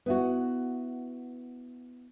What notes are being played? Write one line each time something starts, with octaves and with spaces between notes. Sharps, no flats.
B3 E4 F#4